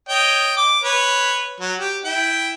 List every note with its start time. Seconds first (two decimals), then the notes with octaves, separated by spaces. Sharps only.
0.09 C#5 D#5 G5
0.57 D6
0.84 B4 C#5
1.60 F#3
1.79 G4
2.05 E4 G5